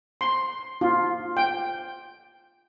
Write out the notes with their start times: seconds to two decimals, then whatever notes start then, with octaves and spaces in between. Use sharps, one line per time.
0.21 C6
0.81 F4
1.37 G5